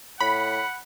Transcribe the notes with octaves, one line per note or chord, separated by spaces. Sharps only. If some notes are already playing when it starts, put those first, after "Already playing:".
A2 F#5 B5